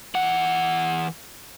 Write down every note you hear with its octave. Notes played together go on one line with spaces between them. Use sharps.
E3 F#5